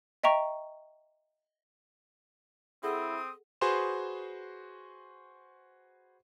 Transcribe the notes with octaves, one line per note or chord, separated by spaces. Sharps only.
D#5 E5 G5 A#5 C#6
C4 E4 G#4 A4 F#5 D#6
F#4 G#4 B4 C5 C6 E7